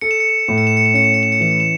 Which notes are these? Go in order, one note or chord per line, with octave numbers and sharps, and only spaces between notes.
A4 C#7
E7
C#7
E7
C#7
A2 E7
C#7
E7
C#7
E7
C#4 C#7
E7
C#7
E7
C#7
E3 E7
C#7
E7